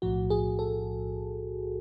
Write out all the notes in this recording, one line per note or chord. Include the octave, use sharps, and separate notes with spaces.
B1 A2 F3 F#4
G#4
A4